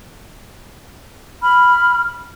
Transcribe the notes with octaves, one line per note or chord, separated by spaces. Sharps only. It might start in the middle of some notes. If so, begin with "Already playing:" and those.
B5 F6